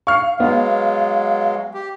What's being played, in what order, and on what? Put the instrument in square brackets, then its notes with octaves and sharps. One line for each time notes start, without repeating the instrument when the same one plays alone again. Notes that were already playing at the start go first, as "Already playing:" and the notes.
[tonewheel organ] F5 [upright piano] C#6 F6 C7
[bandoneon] F#3 G#3 [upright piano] B3
[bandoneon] G4